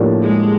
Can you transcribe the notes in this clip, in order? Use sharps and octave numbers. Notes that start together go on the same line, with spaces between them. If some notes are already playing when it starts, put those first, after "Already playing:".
Already playing: A2 F3 A#3 D4 G4
G#3